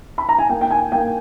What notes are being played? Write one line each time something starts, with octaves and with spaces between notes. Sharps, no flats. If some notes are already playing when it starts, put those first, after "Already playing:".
B5
A#5
G#5
A#3 G5
G5
G#5
A#3 G5